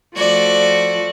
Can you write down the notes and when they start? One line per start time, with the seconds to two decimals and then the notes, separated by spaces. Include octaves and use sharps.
0.17 F3 A3 F#4 D5